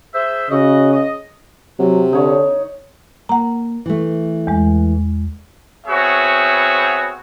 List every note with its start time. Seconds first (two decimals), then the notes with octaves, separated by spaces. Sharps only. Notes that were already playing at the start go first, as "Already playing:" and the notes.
0.14 G#4 C5 E5
0.50 C#3 F#4 D#5
0.92 D#5
1.79 C3 F#3
2.13 D3 D#4 C#5
3.29 A#3 F#5 A#5
3.86 E3 A3
4.47 E2 G#3
5.87 B3 C4 F#4 G#4 C#5 E5